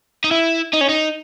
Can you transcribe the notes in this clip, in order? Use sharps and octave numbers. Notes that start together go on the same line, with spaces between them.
D#4
E4
D#4
C#4
D#4